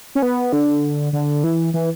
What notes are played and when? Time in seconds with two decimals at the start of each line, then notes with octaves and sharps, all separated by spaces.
0.15 C#4
0.22 B3
0.53 D3
1.13 D3
1.44 E3
1.74 E3